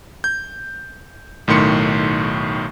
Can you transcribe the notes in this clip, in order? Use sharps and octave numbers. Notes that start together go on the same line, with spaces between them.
G6
B1 A2 D#3 C6 C#7